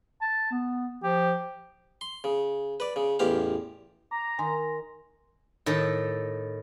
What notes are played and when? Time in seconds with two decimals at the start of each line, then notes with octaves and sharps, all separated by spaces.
0.21 A5
0.51 B3
1.04 F3 G4
2.01 C6
2.24 C#3
2.80 B4 D5
2.96 C#3
3.19 A1 E2 G4 F5
4.11 A#5 D6
4.39 D#3 G#5 C6 A#6
5.66 A2 D#3 A4